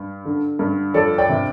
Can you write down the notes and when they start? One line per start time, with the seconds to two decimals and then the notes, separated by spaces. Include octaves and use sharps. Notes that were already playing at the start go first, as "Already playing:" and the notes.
Already playing: G2
0.25 D3
0.59 G2
0.94 F2 A4 D5
1.18 D5 G5
1.29 C3